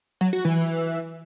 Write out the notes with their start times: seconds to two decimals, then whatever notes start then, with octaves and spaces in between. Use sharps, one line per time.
0.21 F#3
0.33 F#4
0.45 E3